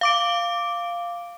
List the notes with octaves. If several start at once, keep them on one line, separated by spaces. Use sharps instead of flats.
F5 D6 D7